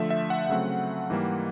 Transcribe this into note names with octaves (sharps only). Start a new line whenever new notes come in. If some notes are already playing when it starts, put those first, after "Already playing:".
Already playing: D3 F3 A3 E5
E5
F#5
C#3 F#3 A3 C4
G#2 E3 G3 A#3